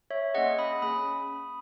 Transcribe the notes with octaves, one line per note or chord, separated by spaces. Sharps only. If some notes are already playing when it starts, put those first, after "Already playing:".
C#5 E5
A#3 C#4 G#4 D#5 F#5
B5 D#6
A#3 C#4 G#4 B5 D#6